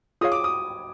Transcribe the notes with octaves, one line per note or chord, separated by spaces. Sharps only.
F4 G#4 C#5 F5 D#6
D6
D#6